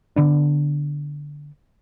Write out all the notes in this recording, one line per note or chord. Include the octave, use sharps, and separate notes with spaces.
D3 B3 D4